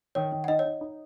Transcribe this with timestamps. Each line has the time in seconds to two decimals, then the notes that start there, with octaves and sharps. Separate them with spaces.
0.15 D#3 C#5
0.32 D#3
0.44 F#5
0.48 D#4 D#5
0.59 C#5
0.65 D#4
0.81 D#4